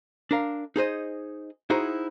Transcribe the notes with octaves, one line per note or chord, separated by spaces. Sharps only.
D4 A#4 F5
D#4 G#4 C5 D#5
D#4 E4 F#4 G#4 C5